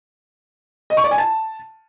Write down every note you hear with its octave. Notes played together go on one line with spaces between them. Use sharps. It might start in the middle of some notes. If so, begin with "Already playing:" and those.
D#5
C#6
D5
G#5
A5